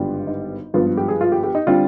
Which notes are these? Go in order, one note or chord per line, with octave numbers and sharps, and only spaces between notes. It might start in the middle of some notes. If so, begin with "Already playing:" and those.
Already playing: G#1 G2 D3 G3 B3 F4
D#4
G#1 G2 F3 B3 F4
G4
G#4
F4
G4
G4
D#4
D3 G3 C4 F4